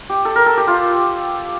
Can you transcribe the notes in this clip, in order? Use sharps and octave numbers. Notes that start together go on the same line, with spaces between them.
G4
A4
A#4
A4
G4
F4